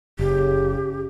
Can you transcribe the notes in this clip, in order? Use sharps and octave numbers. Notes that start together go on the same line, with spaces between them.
F#1 C#3 G4